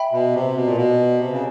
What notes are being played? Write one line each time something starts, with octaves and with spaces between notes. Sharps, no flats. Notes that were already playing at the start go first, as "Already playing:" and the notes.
Already playing: E5 G5 B5
B2
C3
B2
A#2
B2
C3
C#3